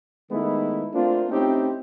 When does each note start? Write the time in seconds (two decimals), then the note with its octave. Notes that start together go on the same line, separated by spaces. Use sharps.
0.31 D#3 G#3 A3 B3 D#4 E4
0.94 A3 A#3 C4 D4 F4
1.31 A3 C4 C#4 D#4 E4 G4